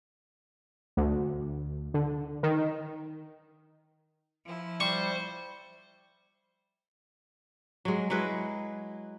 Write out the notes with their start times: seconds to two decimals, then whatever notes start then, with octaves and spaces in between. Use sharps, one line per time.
0.97 D2
1.94 D3
2.43 D#3
4.46 F3 E4
4.80 G3 C5 C#6
7.85 F#3 G#3
8.10 F#3 G#3 E4 B4